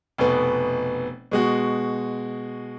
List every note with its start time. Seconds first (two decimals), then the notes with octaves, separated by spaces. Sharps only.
0.18 F1 B2 B3
1.31 B2 G#3 F#4